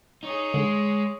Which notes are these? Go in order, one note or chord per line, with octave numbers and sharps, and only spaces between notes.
D#4 G#4 C#5
D3 G#3